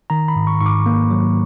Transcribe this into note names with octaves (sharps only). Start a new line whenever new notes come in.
D#3 A#5
B5
G#2
C#6
G#2 C#6
D6
A#3
F#3